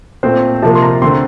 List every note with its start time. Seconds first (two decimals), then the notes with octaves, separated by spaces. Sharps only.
0.23 A#2 A3 C4 C5
0.62 C3 F3 A#3 A5
0.75 C6
0.82 A#5
1.02 D3 A3 C4 C6